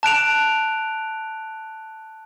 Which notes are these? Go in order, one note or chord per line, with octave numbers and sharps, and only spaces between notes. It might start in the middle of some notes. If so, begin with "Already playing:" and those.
A5 F#6 D7 F7